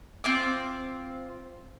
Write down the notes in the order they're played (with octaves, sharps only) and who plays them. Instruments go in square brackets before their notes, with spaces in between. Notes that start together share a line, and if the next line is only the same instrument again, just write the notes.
[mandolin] C4 F4 D6